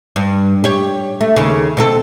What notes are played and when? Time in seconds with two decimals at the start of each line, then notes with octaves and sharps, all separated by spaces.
0.16 G2
0.64 G4 C#5
1.21 A3
1.36 D#2 C#3
1.77 B2 C4 A4